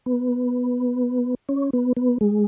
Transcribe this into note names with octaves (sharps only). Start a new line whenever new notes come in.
B3
C#4
B3
B3
G#3